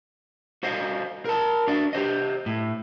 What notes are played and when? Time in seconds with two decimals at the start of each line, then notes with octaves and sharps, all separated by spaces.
0.63 F#4 C5 D#5 F5
1.25 A#4 A5
1.68 D4 F#4 D5
1.93 G4 C5 D#5
2.46 A2